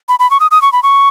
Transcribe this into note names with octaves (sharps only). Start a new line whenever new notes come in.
B5
B5
C#6
D#6
D#6
C#6
B5
C#6